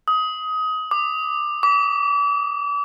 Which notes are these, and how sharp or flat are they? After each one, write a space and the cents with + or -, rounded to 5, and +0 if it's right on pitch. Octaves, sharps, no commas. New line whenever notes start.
D#6 +20
D6 +25
D6 -35